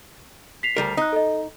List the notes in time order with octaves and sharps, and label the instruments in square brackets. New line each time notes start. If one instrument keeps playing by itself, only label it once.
[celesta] B6 C7 F7
[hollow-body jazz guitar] D2 G3 A#4
[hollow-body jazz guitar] D#4 [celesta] D#6 F#6
[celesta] A4 D#5